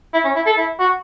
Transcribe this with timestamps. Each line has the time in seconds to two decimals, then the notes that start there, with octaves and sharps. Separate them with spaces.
0.14 E4
0.24 C#4
0.36 E4
0.46 A4
0.58 E4
0.80 F#4